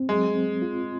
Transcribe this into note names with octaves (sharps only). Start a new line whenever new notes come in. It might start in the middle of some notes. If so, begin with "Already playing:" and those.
Already playing: C4
F#3 G#3
C4
F4